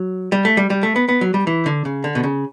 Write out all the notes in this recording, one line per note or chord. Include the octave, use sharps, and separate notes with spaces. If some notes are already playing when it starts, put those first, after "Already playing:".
Already playing: F#3
G3
A3
G3
G3
A3
B3
B3
F#3
G3
E3
D3
C#3
D3
B2
C#3